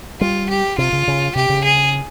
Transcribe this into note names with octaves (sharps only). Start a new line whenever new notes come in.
G3 F4
G4
C3 F4
C#3
C#3
C3 G4
C#3
G#4